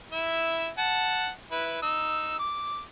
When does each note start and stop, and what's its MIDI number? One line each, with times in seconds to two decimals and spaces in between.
0.12 0.68 64
0.12 0.68 76
0.78 1.29 78
0.78 1.29 81
1.52 1.80 64
1.52 1.80 71
1.82 2.36 63
1.82 2.36 88
2.39 2.82 86